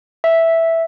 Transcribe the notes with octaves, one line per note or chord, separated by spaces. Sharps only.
E5